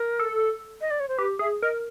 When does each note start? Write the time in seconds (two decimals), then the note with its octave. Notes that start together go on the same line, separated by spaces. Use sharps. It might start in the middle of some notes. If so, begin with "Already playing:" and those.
Already playing: A#4
0.19 A4
0.80 D#5
0.90 D5
0.99 C#5
1.08 C5
1.17 G4 B4
1.39 G#4 E5
1.62 A#4 D#5